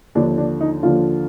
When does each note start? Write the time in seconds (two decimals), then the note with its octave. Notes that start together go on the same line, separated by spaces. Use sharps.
0.15 D#2 D3 F3 D4
0.38 D4
0.61 D#4
0.83 D#2 D3 F3 F4